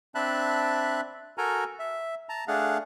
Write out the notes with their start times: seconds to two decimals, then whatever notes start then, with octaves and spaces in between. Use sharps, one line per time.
0.15 C4 D4 E5 A5 B5 F#6
1.38 F#4 A4 A#4 G#5 A#5
1.79 E5
2.29 A5 A#5
2.48 A3 D4 G#4 F5 F#5